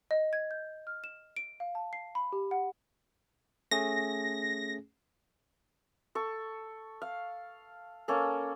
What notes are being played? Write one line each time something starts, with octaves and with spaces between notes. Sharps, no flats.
D#5
G#6
G6
F6
E7
D7
F5
A5
C7
B5
G4
F#5
A3 C#4 G#4 A#6
A4 C#6
F5
A#3 C#4 A4